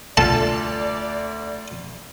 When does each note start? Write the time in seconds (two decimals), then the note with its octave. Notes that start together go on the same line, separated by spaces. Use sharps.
0.17 D2 F4 A4 D5 A5